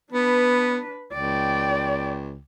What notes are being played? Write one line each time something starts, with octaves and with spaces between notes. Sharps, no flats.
B3 D4 B4
C#2 D5 G5